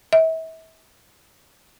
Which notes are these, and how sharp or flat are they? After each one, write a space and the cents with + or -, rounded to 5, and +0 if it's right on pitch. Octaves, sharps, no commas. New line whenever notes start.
E5 -35